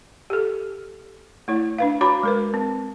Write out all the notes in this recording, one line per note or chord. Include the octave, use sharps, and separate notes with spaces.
G4 A4
A3 E4 C#5
D4 B4 F5
F#4 C#5 A#5 B5 D6
G#3 A#4 B4
C4